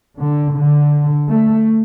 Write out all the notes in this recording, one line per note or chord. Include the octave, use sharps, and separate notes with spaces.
D3
D3
A3